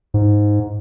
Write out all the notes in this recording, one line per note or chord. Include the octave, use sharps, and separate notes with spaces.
G#2